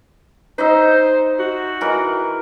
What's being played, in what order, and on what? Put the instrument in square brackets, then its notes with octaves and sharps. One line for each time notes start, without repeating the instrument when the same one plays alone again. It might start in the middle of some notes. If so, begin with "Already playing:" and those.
[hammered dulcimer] D#4 D#5 E5 [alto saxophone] C5
[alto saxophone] F#4
[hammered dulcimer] E3 A#4 D#5